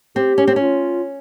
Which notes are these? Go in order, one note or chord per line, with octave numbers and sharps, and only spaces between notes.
C4 G4
C#4
C4
C#4 F4